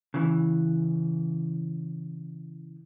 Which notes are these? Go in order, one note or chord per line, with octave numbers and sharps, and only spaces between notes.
C#3 E3